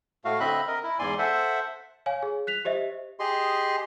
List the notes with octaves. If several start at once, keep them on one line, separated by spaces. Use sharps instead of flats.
A2 A3 F#4 F5
D3 C4 D#5 E5 B5 F#6
A#4 D#5
E4
E2 G#2 D5 G#5 C6
A4 C5 E5 F#5
C#5 F5 G#5
G#4
F#6 B6 F7
G4 C5 D#5 E5
G4 G#4 D#5 C6